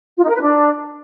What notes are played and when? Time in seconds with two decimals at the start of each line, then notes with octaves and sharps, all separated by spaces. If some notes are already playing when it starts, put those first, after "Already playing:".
0.17 F4
0.23 D#4
0.29 A#4
0.35 B4
0.41 D4